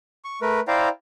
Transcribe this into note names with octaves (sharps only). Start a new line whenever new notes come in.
C#6
A3 A#4 B4
E4 C5 D5 F5 G5 A#5